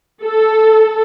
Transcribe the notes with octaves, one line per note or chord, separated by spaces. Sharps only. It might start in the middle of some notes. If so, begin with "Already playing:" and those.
A4